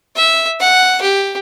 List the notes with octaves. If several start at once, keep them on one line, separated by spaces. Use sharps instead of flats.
E5
F#5
G4